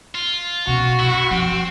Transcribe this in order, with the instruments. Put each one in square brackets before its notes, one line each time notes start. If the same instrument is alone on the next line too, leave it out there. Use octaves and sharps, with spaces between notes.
[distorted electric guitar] F4
[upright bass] B2 C#4 [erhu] F#4
[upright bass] F#2 D#3 [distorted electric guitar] E4
[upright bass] F3 [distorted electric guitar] C4